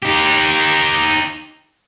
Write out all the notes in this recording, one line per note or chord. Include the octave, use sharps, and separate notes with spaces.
D#4 G4